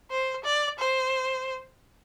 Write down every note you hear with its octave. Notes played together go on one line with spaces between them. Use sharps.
C5
D5
C5